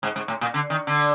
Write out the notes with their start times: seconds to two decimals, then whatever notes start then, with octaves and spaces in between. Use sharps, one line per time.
0.03 G#2
0.16 G#2
0.28 A2
0.41 A#2
0.54 D3
0.70 D#3
0.87 D3